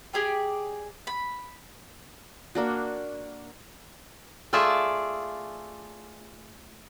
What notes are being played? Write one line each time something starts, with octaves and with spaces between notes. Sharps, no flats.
G4 G#4 D5 G5
B5
A#3 D4 F#4
A3 F4 G#4 D5 E5 A5